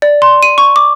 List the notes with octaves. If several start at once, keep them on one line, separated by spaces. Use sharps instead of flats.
D5
C6
D#7
C#6
D6